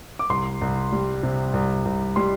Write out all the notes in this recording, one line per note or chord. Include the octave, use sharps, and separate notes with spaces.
D6
C2 C6
C2
G3
C3
C2
C2
G3 C6